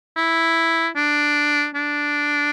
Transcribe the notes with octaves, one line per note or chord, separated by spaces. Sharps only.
E4
D4
D4